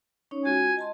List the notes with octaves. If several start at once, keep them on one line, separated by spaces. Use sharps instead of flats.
C#4 D#4 C#5
G#3 F4 F#4 G#5
D#5 A5 C6